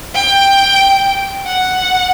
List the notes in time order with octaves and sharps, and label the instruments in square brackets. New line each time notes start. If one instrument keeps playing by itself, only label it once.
[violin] G5
F#5